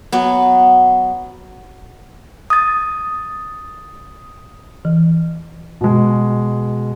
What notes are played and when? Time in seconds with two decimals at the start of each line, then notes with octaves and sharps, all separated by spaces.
0.12 F#3 B3
2.50 D#6 A6
4.85 E3
5.81 B2 G#3